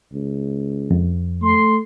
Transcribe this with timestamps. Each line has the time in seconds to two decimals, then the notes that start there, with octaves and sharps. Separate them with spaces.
0.13 C#2
0.91 F2
1.42 A3 C6